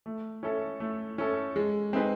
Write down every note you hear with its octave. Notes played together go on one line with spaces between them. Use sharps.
A3
C#4 E4 A4
A3
C#4 E4 A4
G#3
C4 D#4 G#4 B4